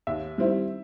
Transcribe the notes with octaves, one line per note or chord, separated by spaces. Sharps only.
D#2 E5
D#3 G3 C4 E4